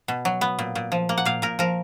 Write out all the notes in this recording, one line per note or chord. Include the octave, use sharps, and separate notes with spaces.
B2
F#3
B3
A#2
A#2
F3
A#3
F#5
A#2 F5
A#2 A#4
F3 A#4